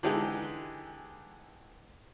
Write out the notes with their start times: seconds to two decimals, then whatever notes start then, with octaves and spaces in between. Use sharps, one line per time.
0.03 D3 E3 G#3 D#4 G4